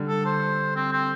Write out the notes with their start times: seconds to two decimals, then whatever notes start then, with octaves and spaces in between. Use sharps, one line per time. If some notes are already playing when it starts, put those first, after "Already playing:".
Already playing: D3 G3
0.08 A4
0.25 C5
0.76 C4
0.92 C4